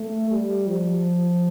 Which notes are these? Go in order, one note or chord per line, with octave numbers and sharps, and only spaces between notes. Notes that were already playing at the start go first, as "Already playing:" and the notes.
Already playing: A3
G3
F3